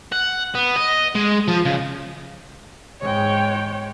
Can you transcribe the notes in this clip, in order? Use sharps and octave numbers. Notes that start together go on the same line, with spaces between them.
F#5
B3
D#5
G#3
F3
C#3
G#2 G#3 C#5 G5